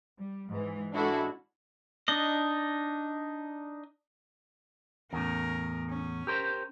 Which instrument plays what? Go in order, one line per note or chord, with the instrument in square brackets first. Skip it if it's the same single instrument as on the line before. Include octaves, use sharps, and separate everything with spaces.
[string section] G3
G#2 E3
G#3 C#4 D4 E4 F#4 A4
[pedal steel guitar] D4 D#4 D#5
[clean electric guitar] E2 A2 [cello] C#4 A#4
[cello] C#4
[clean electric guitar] G4 A#4 C5